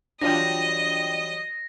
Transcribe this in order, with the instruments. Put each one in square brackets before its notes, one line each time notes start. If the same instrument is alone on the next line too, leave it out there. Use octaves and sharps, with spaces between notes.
[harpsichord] E3 F#3 G3 [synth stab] D4 F4 G5 [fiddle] D#5 [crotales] A#6